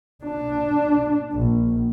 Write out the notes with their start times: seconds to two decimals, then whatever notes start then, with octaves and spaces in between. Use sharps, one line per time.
0.25 D4
1.33 A#1